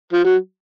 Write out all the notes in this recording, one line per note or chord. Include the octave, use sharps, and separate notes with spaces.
F3
F#3